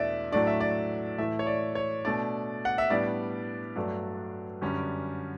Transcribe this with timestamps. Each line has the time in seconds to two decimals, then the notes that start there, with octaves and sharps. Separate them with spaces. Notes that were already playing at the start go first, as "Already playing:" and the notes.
Already playing: E2 B2 A3 D4 D5 E5
0.32 A2 F#3 A3 D4 D5
0.47 E5
0.60 D5
1.18 A2 E3 A3 E5
1.39 C#5
1.46 D5
1.75 C#5
2.05 B2 A3 D4 D5
2.65 F#5
2.78 E5
2.90 A2 G3 B3 D4 D5
3.76 G2 F#3 A3 D4
4.61 F#2 D3 G3 C#4